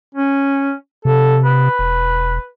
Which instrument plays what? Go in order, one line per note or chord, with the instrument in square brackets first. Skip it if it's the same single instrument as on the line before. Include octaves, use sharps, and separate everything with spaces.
[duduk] C#4
[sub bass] C3 [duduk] A4
[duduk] B4
[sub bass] E1